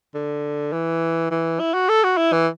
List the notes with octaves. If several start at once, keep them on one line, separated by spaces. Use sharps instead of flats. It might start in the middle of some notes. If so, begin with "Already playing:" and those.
D3
E3
E3
E4
F#4
A4
F#4
E4
E3